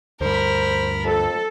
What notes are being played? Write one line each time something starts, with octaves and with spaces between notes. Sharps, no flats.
D2 G2 A#4 C5 B5
F2 A4